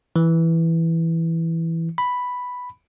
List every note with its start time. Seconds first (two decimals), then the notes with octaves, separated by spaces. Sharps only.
0.16 E3
1.98 B5